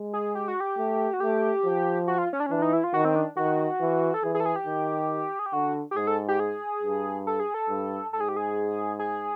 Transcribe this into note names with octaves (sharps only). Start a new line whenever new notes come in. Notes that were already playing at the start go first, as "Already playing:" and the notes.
Already playing: G#3
G#4
G4
F#4
G4
A3
F#4
A3 G4
F3
F#4
F4
C#4
D4
C#4
E3 D4
D#4
E4
F4
D#3 F#4
C4
D4
D#3 F#4
E3
A4
E3 G#4
G#4
A4
G#4
G4
D#3
G#4
G4
D3 F#4
G4
G#2 G#4
A4
G4
G#4
G2
A4
G#4
A4
G2
G#2 A4
G#4
G4
G#4
G#4